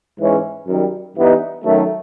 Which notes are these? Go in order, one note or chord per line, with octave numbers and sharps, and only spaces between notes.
G#2 E3 G#3 C#4
F#2 D#3 G3
G2 E3 G3 B3 D#4
F#2 D#3 F#3 A3